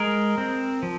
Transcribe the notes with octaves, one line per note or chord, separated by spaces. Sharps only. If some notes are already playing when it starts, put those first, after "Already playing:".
Already playing: G#3 A#4
C4
F3